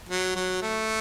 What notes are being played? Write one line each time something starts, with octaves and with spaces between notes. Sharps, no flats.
F#3
F#3
A3